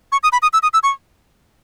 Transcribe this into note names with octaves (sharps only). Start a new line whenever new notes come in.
C#6
D#6
B5
D#6
E6
D#6
E6
C#6